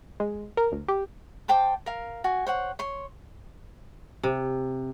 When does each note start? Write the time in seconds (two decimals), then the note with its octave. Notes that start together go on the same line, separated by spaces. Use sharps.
0.20 G#3
0.57 A#4
0.72 D2
0.88 G4
1.48 C5 G5 A5 D6
1.86 A#4 F5
2.24 F#4 G#5
2.47 C5 C#5 F#5
2.79 C#5 C6
4.23 C3